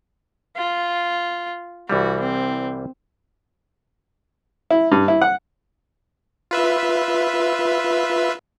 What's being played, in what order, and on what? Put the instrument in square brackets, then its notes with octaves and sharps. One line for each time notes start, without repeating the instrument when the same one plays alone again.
[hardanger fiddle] F4
[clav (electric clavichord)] C2 E3 G3 [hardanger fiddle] F#4
[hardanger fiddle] C4
[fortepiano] E4
G2
E4
F#5
[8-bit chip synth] F4 B4 E5